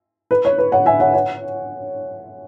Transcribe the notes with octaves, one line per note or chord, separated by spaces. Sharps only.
B4
C#5
B4
C#5 F#5
E5 G#5
C#5 F#5
C#5 F#5